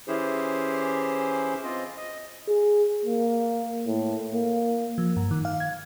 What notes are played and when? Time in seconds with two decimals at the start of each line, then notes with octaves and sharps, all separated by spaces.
0.08 E3 C#4 E4 G4 G#4 C5
1.64 C4 F4 D#5
1.97 D#5
2.48 G#4
3.05 A#3
3.87 A2
4.34 A#3
4.98 F3
5.16 G2
5.31 D#3
5.45 F5
5.60 G#6